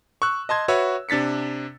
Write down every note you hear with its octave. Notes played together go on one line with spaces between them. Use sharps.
C#6 E6 F#6
D#5 A5 C6 G#6
F#4 B4 C#5 E5 E6
C3 D4 A6 B6 C#7